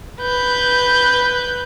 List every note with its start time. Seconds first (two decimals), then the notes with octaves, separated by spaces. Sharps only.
0.21 B4 G6